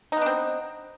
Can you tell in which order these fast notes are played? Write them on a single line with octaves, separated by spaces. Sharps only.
D#4 B3 D4 C4